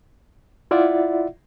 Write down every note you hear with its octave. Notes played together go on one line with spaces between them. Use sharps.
E4 F4 D5 E5 F#5